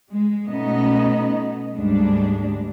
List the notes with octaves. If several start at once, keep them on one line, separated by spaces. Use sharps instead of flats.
G#3
B2 A3 B3 C#4 D#4 D#5
D2 G#2 G3 G#3 D4